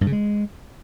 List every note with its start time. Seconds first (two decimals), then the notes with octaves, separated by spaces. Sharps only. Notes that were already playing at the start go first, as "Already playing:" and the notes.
0.01 G2
0.07 C#3
0.12 G#3